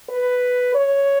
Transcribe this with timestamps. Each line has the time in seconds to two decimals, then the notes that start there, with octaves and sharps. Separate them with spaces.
0.10 B4
0.74 C#5